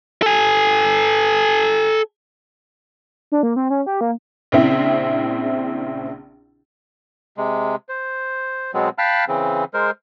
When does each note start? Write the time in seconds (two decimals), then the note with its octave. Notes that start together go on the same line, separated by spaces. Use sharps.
0.22 A4 G#5
3.32 D4
3.43 A#3
3.56 C4
3.70 C#4
3.86 G4
4.01 A#3
4.52 A#1 C#3 C4 E4
7.38 C3 G#3
7.89 C5
8.74 B2 F#3 G#3 B3 C4
8.98 F5 G5 A5 B5 F6 F#6
9.28 C#3 E3 C4
9.74 G#3 A#4 C5